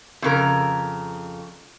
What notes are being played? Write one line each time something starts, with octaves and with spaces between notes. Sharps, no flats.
F2 C#3 A#4